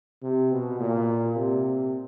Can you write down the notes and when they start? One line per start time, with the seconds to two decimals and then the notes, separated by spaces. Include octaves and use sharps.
0.22 C3
0.51 B2
0.80 A#2
1.36 C3